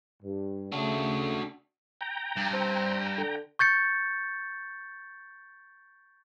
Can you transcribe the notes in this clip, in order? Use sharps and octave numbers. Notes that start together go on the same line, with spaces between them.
G2
C#3 A3 D4 F#4
G5 A#5
G2
C4
D3
C#6 G6 A6 C#7